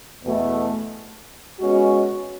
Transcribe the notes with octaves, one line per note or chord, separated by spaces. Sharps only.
E2 B2 A3
B2 G#3 C#4 F#4